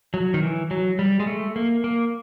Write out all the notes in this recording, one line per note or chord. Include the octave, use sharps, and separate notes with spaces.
F#3
D#3
E3
F#3
G3
G#3
A3
A#3
A#3